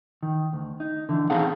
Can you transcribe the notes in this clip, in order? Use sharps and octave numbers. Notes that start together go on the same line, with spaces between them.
D#3
D2
D#4
D3 E3
C4 D#4 G#4 A4 F5 F#5